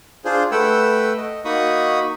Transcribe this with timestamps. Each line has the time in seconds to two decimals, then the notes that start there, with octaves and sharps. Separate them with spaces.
0.25 D4 F4 G#4 C5
0.52 A3 B4 F#5 G5 E6
1.17 D#5
1.45 A#3 D#4 F#4 B5 C#6 D#6